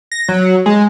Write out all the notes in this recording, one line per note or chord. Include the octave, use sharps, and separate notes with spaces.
A#6
F#3
G#3